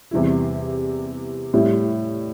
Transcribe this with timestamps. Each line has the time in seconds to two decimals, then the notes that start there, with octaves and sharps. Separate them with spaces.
0.11 E2 C3 G3 E4
1.54 A2 G3 E4